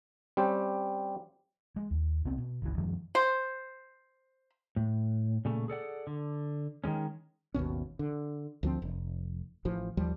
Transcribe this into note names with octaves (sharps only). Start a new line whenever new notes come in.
G3 C4 C#4 G4
G#3
D#2
C2 B3 C4
B2
G1 C#2 E3
F#2 D#3 F3 G#3
C5
A2
A#2 C#3 A3
G#4 A4 D5 F#5
D3
D#3 E3 G#3 C#4
G#1 D#2 B2 C#4
D3
D2 F3 C4
F1
A1 E3 F3
D#2 F3 G3